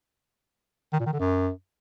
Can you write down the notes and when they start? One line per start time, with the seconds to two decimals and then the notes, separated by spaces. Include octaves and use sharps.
0.93 D#3
1.00 A#2
1.06 D#3
1.13 D3
1.19 F#2